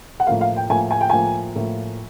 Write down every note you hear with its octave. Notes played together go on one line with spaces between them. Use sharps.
F#5
A2 F3 A#3 F5
F5
G5
A2 F3 A#3 G#5
G#5
G5
A2 F3 A#3 G#5
A2 F3 A#3